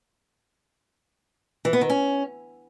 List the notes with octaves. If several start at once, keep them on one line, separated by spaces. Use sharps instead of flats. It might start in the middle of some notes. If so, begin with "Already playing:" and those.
E3
B3
D#3
C#4